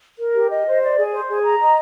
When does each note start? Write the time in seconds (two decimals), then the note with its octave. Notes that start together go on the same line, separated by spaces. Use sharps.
0.19 A#4
0.35 G4
0.50 D#5
0.66 C5
0.82 D5
0.98 G#4
1.13 C5
1.28 G#4
1.44 A#5
1.60 D#5